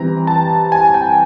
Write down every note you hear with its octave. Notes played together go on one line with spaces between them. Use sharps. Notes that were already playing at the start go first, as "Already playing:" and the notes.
Already playing: E3 G3 C4 A#5
A5
G#5
G5